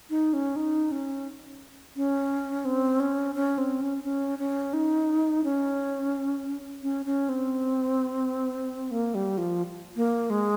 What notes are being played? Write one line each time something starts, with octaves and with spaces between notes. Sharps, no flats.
D#4
C#4
D#4
C#4
C#4
C4
C#4
C#4
C4
C#4
C#4
C#4
D#4
C#4
C#4
C#4
C4
A#3
G3
F3
A#3
G#3